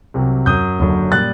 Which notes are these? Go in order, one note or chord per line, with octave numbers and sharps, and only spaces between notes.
C2 C3 F#3
F#2 F#3 D#6 G6
F#1 F#2 D3 F#3
A#2 G3 F#6 A6